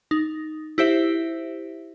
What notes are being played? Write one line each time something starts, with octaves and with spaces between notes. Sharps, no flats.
D#4
E4 G4 C5 E5